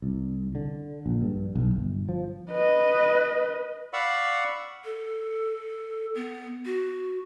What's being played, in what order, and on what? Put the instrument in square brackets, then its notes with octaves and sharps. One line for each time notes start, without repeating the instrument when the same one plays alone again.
[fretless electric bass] C2
D3
A#1
G2
B1
G1
F3
[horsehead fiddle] B4 D#5
[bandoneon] D5 F5 F#5 B5 C#6 E6
[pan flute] A4
B3
F#4